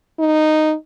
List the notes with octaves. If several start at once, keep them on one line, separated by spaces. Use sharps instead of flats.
D#4